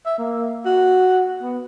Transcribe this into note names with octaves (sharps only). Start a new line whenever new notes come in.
E5
A#3
F#4
B3